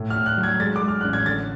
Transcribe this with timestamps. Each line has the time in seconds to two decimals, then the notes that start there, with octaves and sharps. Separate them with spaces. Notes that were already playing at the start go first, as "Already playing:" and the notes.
Already playing: A2
0.10 F6
0.16 A2
0.26 F#6
0.38 F#3
0.43 G#6
0.60 G#3 A6
0.76 D6
0.82 G#3
0.88 F6
1.01 A1 F#6
1.13 G#6
1.26 D3 A6